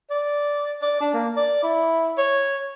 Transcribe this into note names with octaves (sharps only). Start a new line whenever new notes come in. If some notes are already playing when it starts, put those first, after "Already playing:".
D5
D5
D4
A#3
D5
E4
C#5